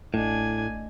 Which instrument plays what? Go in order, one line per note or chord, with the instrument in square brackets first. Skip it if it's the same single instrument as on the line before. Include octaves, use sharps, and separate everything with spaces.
[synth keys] A1 A3 D#5 [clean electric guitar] A2 [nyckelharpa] D4 G#5